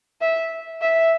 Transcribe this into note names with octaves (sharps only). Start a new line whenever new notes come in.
E5
E5